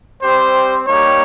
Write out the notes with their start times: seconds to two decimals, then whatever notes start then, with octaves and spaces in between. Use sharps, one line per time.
0.22 G3 C4 G4 C5
0.86 G3 A#3 D#4 G4 C#5